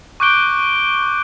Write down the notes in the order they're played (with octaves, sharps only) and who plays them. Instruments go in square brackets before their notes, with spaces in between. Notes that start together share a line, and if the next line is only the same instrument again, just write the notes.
[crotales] C#6 D6 F#6 G6 D7 G7